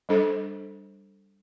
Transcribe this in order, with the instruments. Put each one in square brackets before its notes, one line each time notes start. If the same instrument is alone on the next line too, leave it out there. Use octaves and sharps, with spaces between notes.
[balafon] G3 D4 A4 C5